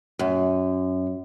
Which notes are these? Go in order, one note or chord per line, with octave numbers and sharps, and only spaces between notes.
F#2